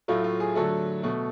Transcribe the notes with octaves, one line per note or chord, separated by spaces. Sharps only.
A2 F#3 A3 F4
F4
G#4
D3 F#3 A3 A4
B2 A3